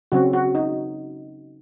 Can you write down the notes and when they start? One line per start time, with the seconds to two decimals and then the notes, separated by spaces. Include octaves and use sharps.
0.12 C#3 F#3 C4 F#4
0.33 F#4
0.55 D#4